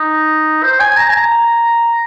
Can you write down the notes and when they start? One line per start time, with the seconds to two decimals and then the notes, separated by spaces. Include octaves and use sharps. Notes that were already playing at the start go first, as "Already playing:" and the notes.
Already playing: D#4
0.63 C5
0.80 G#5
0.97 A#5
1.09 G#5
1.14 A#5